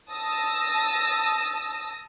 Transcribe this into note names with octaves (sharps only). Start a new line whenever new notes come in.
A5 D#6 E6 A#6